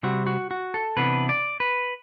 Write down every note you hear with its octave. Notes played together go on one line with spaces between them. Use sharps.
C3 G3 C4 F#4
F#4
F#4
A4
C3 E3 B3 D4 B4
D5
B4